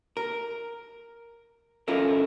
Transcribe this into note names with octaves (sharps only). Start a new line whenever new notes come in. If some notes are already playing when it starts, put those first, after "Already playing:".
A#4
C#4 E4 F4 A4 A#4